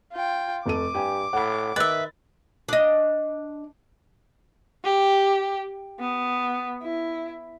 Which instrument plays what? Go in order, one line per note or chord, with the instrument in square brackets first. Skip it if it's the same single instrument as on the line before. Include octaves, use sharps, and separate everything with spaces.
[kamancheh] F4 G5
[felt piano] F1 A4 D#7 [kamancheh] D6
[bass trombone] G2 [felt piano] G4 G5 G#5
[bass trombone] A2 [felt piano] F#5 B5
[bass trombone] D#3 [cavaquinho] B4 E5 [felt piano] D#5 A6
[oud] D4 D#5
[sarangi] G4
B3
E4